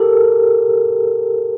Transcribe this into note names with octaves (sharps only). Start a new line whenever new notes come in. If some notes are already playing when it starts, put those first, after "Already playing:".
Already playing: G4 A4 A#4